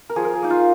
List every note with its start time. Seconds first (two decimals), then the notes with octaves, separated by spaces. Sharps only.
0.10 A#4
0.16 F3 G#4
0.25 A#4
0.33 G#4
0.42 A#3 D#4
0.50 F4